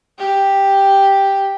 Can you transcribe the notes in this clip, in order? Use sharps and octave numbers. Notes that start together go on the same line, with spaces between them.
G4